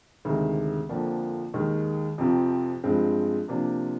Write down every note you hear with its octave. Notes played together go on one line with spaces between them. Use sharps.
D2 C3 D#3 G#3
F2 D3 F3 A#3 D4
D#2 D#3 G#3
F2 C3 F3 C4
G2 F3 G#3 C4
C3 F3 A#3 D4